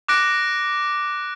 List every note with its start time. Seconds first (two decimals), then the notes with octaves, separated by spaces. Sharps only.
0.08 D6 F#6 A#6 D7